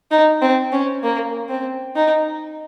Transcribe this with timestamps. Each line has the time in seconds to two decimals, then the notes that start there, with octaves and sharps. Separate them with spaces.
0.11 D#4
0.42 C4
0.72 C#4
1.03 A#3
1.49 C4
1.96 D#4